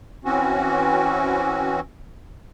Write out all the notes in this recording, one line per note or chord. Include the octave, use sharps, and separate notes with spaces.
E3 C4 C#4 F#4